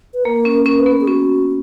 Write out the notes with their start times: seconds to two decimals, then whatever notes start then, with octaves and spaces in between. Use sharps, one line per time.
0.14 B4
0.24 A#3 A#4
0.45 C#4
0.65 C#4 A#4
0.79 B4
0.86 B3
0.92 A#4
1.01 G#4
1.07 C#4 F#4